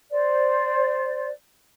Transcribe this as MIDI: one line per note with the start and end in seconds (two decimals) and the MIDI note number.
0.11 1.28 72
0.11 1.28 74